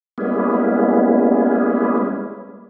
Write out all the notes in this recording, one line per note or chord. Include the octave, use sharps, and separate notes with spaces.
G3 G#3 A#3 B3 C#4 E4